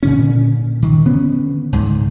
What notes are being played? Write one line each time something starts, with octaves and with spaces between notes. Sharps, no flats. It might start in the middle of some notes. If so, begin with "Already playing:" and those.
A#2 D3 C#4
D#3
D3 B3 C#4
C#2 G#2